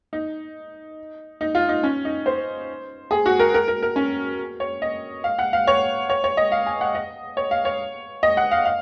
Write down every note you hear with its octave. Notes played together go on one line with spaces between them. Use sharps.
D#4
D#4
F4
D#4
C#4
D#4
C5
G#4
F#4
A#4
A#4
A#4
A#4
C#4
C#5
D#5
F5
F#5
F5
C#5
C#5
C#5
D#5
F5
G#5
F#5
D#5
C#5
F5
C#5
D#5
F#5
F5
F5